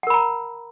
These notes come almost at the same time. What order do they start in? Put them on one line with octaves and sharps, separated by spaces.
F#5 A#4 B5 A#5